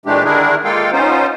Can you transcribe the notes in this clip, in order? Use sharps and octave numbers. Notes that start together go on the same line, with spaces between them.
A#2 E3 G#3 A3 D4 G4
D3 D#3 D4 E4 G#4 A#4
G#3 A#3 F4 A4 F5 G5
B3 C#4 D#4 F4 C5